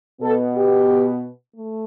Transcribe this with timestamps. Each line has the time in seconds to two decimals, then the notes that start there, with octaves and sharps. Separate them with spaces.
0.22 B2 B3 A4
0.55 G4
1.56 A3